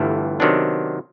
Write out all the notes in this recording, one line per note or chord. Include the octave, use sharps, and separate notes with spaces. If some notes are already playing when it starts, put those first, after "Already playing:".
Already playing: G1 G2 E3 A3
C3 D#3 F#3 B3 D4